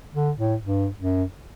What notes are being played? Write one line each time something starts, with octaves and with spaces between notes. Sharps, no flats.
D3
A2
G2
F#2